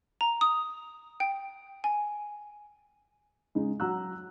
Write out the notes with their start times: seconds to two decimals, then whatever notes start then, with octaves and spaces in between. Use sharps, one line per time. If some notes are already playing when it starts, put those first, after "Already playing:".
0.21 A#5
0.41 D#6
1.20 G5
1.84 G#5
3.55 C#3 G#3 D#4
3.80 F#3 F#5 A#5 E6 F#6